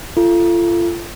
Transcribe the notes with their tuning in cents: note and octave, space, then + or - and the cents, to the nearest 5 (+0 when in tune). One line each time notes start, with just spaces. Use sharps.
F4 -35 A4 +0